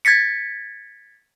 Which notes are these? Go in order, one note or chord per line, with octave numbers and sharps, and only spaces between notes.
G#6 A6 B6 C#7